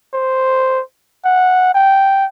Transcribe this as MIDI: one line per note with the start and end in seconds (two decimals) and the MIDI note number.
0.14 0.81 72
1.25 1.74 78
1.74 2.26 79